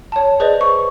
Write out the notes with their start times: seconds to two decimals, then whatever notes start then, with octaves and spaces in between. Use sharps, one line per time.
0.12 C#5 A5
0.40 G#4 B4 C5 D5 D#5
0.61 C#6